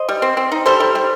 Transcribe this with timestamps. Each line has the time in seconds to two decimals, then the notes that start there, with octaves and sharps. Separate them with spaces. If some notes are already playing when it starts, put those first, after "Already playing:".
Already playing: C5 D#5
0.09 G3
0.22 C4
0.37 C4
0.52 D#4
0.66 G3 A4 C5
0.80 G3
0.95 G3